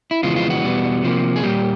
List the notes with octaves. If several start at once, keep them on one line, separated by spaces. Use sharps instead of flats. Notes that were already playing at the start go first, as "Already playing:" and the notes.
E4
F2 C#3 E3 G#3 B3 F4
F4
F#4
E2 B2 G3 B3
C3 F3 A#3
G#4
A#2 G3 A#3 G4